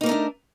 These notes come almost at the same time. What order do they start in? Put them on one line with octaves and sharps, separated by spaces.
D#4 A#3 A#4 A3 D4